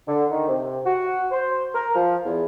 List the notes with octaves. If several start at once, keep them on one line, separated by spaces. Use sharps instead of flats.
D3
D#3
C3
F#4
C5
A#4
F3
E2